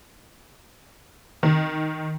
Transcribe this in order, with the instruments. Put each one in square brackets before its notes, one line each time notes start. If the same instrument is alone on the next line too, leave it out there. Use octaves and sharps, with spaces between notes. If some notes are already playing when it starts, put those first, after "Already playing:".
[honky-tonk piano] D#3